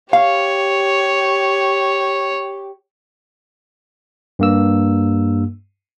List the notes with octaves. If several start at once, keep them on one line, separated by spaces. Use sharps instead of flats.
G4 C#5 F5
G2 A#3 E6